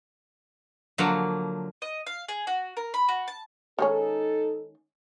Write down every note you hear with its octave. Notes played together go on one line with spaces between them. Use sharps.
D3 F3 F#3 A#3
D#5
F5
G#4
F#4
A#4
B5
F#4
A5
D#3 G#3 C#4 D#4 A4